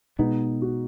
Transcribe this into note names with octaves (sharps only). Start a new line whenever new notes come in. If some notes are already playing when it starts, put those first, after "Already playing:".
B2 G#3 B3 D#4
F#4